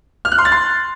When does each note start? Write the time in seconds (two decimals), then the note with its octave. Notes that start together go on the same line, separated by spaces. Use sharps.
0.25 F6
0.32 F#6
0.38 C6
0.45 A6
0.52 C6